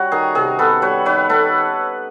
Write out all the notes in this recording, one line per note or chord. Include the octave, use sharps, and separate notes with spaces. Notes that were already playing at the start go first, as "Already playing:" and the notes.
Already playing: G3 C#4 F#4
D#3 G#4 A#4
C3 G#4 A#4
B3 A4 B4
G3 B4 C#5
D#3 B4 C#5
B3 A4 B4